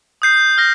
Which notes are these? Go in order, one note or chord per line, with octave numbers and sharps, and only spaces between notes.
D#6 G6 C7
F6 A#6